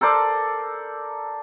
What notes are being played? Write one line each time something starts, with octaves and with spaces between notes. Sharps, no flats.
A4 A#4 C5 D5